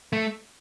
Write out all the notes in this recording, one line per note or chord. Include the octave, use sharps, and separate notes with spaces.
A3